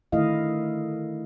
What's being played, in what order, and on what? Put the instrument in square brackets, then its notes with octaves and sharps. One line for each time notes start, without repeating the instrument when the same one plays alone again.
[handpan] D3 D#3 A3 E4 D#5 F5